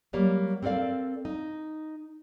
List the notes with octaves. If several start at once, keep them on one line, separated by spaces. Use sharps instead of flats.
F#3 G3 A#3
C4 A4 A#4 D5 F5
D#4